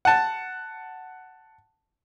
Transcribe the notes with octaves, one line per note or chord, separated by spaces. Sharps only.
F#5 A5